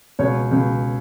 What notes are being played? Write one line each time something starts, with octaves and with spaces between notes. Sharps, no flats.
C#2 B2 C#5
C#2 B2